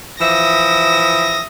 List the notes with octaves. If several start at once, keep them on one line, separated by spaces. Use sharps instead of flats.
E3 F3 E5 D#6 A#6